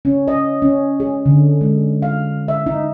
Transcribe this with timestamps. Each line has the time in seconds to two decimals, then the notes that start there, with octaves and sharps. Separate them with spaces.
0.05 C#4
0.28 D#5
0.62 C#4
1.00 G#4
1.26 D3
1.61 G#3
2.02 F5
2.48 E5
2.66 D#4